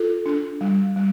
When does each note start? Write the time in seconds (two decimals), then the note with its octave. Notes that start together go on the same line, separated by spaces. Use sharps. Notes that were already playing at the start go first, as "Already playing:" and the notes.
Already playing: F4 A4
0.26 D4
0.61 G3
0.96 G3